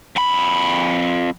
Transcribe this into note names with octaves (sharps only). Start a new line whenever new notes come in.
F2 B5